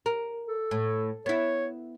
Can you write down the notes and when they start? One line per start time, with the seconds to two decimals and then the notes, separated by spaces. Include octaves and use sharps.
0.06 A#4
0.48 A4
0.71 A2
1.26 B3 E4 C#5